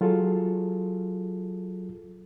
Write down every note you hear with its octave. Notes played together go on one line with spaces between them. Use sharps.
F#3 F4 G#4 A4